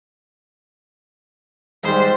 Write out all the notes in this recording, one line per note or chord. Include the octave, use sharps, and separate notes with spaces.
G#2 G3 C5